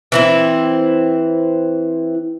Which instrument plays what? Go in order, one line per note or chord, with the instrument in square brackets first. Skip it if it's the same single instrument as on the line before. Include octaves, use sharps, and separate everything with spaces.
[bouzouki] E3 C4 E4